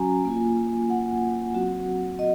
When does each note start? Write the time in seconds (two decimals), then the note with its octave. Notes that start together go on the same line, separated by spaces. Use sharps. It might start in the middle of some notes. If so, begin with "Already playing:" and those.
Already playing: F#3 C#4 F#4 G#5 A#5
0.25 A#3 F4
0.90 F#5
1.54 F#3 C4 F#4
2.19 D#5